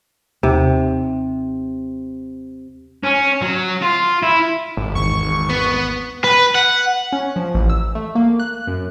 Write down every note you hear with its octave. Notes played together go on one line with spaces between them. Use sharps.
D#2 C3
C#4
F#3
F4
E4
G#1
E2 G#2 D#3 C#6
B3
B4
F#5
C#4
F3
A1
E6
A3
A#3
F#6
F#2